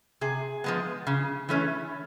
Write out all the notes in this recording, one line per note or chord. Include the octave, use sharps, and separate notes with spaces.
C3 G#4
F3 G#3 B3
C#3
E3 A3 C#4